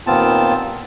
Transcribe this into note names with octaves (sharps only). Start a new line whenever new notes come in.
D#2 A#2 B3 C4 F4 A5